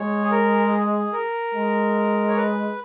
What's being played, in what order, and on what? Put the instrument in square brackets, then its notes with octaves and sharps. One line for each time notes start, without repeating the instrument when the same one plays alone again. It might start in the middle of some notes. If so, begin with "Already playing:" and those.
Already playing: [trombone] G#3 [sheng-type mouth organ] C#5
[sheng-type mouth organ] G#4
A#4
G#4
A#4
[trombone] G#3
[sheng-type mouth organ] C#5
B4